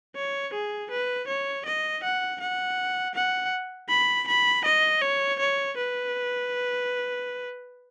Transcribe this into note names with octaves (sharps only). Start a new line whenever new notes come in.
C#5
G#4
B4
C#5
D#5
F#5
F#5
F#5
B5
B5
D#5
C#5
C#5
B4